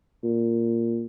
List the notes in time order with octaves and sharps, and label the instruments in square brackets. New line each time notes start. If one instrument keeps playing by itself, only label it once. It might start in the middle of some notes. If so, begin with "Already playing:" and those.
[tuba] A#2